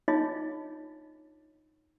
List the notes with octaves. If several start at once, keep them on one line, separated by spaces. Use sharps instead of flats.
D4 D#4 F4 G#4 C#5 D#5